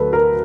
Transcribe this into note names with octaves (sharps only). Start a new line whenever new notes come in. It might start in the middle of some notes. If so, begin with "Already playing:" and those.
Already playing: D2 D3 F#3 A4 B4
A#4